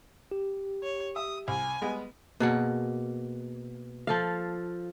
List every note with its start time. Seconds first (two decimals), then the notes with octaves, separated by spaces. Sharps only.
0.31 G4
0.83 C#5
1.16 E5 D#6
1.48 C2 G#5
1.81 G3 G#3 B3
2.40 B2 A#3 G#4 F#5
4.07 F3 A4 F5